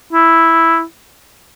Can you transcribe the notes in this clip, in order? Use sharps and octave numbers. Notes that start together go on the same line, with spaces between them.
E4